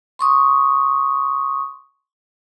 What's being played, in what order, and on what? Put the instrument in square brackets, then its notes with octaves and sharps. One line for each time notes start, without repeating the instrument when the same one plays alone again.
[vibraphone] C6 C#6 D#6